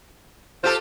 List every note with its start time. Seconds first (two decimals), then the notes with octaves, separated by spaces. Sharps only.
0.64 F4 G4 A4 C5